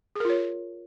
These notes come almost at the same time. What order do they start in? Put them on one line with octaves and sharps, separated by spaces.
G#4 A#4 F4 C#5